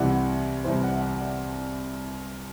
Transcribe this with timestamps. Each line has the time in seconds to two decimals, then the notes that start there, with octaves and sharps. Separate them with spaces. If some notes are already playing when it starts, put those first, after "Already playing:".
Already playing: C2 C3 E3 D5 F#5
0.64 C2 C3 E3 C5 E5
0.83 D5 F#5
0.96 E5
1.02 D5 F#5
1.21 D5 F#5